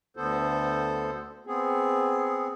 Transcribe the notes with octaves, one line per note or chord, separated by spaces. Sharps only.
D2 D3 B3 A4 C5
B3 C4 G#4